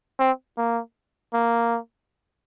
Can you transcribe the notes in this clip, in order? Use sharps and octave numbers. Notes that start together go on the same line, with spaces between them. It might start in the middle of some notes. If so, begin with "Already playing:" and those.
C4
A#3
A#3